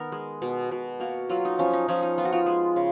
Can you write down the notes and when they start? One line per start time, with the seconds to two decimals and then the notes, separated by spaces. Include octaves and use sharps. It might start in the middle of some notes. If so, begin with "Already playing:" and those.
Already playing: D#3 B3 A#4
0.12 G#3
0.42 B2
0.71 B2
1.00 A#3 F#4
1.29 F#3 F4
1.45 D#4
1.59 F3 C#4
1.73 D#4
1.88 F3 C#4
2.03 D#4
2.18 B3 F4
2.25 F#4
2.33 F4
2.46 G#3
2.76 C#3